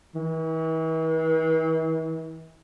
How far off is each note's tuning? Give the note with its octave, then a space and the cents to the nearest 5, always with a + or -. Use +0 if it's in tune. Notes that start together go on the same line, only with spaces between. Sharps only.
E3 -40